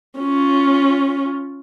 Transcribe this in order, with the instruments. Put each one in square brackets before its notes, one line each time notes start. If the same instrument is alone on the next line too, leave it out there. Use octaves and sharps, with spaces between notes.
[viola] C#4 F4